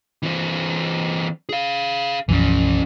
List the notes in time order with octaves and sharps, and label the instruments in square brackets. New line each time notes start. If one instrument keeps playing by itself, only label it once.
[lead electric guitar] E3 C4
G#4 F5
[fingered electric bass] B1 F#2 F3 [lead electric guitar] E3 C#4